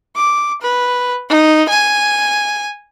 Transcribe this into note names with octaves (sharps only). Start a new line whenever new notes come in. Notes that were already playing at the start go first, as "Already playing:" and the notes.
D6
B4
D#4
G#5